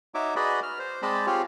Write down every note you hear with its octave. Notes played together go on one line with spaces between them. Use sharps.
D#4 F#4 C#5 E5 D6
F#4 G#4 B4 D5 D#5 B5
F6
C5
G#3 C4 D5 D#5 A5 B5
C4 F4 G4 G#4 C#5